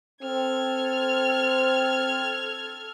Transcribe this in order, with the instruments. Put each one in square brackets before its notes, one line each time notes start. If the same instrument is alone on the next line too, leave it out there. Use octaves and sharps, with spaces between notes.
[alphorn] C4 [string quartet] A4 F6 G#6